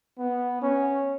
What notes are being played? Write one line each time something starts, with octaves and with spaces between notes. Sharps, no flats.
B3
C#4